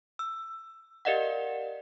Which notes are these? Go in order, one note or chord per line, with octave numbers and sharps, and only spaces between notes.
E6
G4 A#4 D5 D#5 F5 F#5